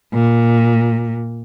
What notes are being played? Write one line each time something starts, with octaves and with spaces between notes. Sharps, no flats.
A#2